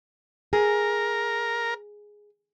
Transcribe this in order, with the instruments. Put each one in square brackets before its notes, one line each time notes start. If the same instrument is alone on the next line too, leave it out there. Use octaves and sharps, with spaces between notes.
[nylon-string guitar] G#4 [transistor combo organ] A#4